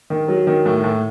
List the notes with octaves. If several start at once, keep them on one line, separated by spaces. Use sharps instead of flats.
D#3
F#3
D#3
A2
A2